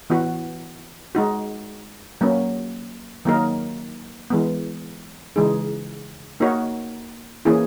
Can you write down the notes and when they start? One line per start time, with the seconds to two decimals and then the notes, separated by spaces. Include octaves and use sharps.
0.10 E3 B3 F#4
1.15 G#3 D#4 F#4
2.21 F#3 A#3 C#4
3.25 D#3 F#3 A#3 D#4 A#4
4.30 E3 G#3 B3
5.36 C#3 E3 G#3 D#4 G#4
6.40 A#3 D#4 F#4 A#4 C#5
7.45 E3 A#3 C#4 E4 G#4